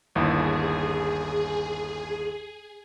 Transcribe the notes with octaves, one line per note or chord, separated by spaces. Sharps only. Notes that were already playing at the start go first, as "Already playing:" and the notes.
G1 D#2 E4 G#4